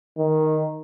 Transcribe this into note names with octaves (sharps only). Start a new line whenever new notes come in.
D#3